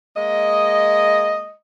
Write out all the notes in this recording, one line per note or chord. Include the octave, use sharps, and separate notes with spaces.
G#3 A#3 D#5